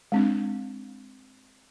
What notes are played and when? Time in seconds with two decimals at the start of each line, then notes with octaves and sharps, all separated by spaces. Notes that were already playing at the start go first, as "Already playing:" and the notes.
0.12 G#3 C4 D4